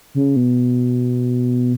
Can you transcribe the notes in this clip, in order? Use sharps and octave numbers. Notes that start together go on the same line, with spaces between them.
C#3
B2